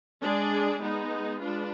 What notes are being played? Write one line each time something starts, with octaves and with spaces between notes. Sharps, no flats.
G#3 D4 G#4 D5
G#3 B3 D#4
G#3 D4 F4 B4